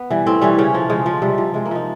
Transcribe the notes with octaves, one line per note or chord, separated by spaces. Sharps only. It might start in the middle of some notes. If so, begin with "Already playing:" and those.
Already playing: B3
E3 G3
A2 C4
E3 G3 C#4
C#3 C#4
F3
C#3 G#3
F3
C3 G3
F3
C3 G#3
A#3
F3 D#4